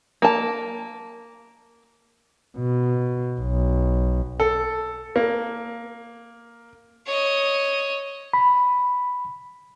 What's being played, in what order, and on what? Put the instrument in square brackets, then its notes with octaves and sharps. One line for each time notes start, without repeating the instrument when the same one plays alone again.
[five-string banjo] A#3 A5
[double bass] B2
B1
[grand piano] A4
A#3
[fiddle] C#5 D#5
[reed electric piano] B5